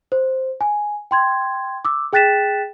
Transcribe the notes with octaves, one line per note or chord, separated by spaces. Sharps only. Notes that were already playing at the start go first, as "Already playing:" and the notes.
C5
G#5
G5 C6 G#6
D6 E6
G#4 G5 F#6 A6 B6 E7